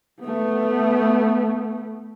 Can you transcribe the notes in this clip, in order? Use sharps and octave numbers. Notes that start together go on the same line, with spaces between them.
A3 B3